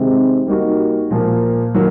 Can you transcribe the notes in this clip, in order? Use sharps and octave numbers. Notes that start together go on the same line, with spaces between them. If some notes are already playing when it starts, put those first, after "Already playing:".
Already playing: C3 D#3 G#3 C4
G3 A#3 D#4 F#4
A#2 F3 A#3
D#3 F#3 A#3